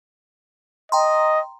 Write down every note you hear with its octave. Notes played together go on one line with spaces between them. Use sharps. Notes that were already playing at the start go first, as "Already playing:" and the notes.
D#5 G5 A#5 C6